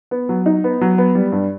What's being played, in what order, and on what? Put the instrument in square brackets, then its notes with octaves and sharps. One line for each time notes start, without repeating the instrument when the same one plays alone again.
[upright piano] B3
F#3
D#4
B3
F#3
B3
G3
G2